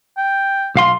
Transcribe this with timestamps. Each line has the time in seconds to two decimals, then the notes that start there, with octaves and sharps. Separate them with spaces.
0.18 G5
0.75 B1 F5 C6